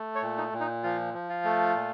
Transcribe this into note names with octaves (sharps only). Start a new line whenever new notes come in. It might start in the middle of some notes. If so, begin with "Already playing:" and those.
Already playing: A3
C#5
A#2
D#4
A#2
D#4
F3 F4
F3
F4
A3
A#2